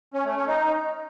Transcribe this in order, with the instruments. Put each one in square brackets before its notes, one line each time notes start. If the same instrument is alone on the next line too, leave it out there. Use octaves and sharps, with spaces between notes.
[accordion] C#4
A3
C#4
D#4